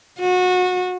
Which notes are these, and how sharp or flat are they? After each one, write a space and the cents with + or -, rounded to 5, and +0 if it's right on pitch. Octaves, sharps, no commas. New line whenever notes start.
F#4 -25